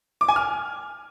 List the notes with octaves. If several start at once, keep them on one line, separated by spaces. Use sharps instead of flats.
D6
G#5
F6